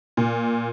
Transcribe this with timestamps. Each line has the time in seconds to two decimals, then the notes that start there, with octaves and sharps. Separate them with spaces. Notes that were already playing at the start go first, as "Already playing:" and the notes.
0.17 A#2